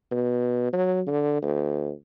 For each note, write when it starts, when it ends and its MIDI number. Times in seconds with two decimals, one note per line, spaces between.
0.11 0.73 47
0.73 1.01 54
1.07 1.38 50
1.42 1.91 38